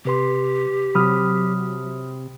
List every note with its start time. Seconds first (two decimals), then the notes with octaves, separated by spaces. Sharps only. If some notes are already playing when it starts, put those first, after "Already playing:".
0.05 C3 G4 B4 C6
0.95 C3 F#3 B5 D#6 F6